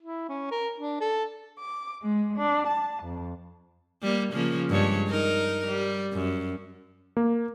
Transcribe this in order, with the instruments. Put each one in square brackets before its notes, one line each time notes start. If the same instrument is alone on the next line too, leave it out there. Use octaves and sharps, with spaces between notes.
[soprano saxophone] E4
C#4
A#4
D4
A4
[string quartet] D6
G#3
D4
A5
F2
[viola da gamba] G3 A#3
C#3 F3 A#3
G2 G#3 C#5
D#4 A#4
G3
F#2
[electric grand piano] A#3